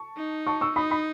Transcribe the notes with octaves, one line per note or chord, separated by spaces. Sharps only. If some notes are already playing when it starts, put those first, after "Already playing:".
Already playing: A5 C#6
D#4
A5 C#6
C#6 E6
D#4 B5 D#6
B5 D#6